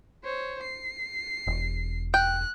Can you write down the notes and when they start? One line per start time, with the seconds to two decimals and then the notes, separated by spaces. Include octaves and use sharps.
0.24 C5 C#5
0.62 C7
1.47 E1
2.14 G5 F#6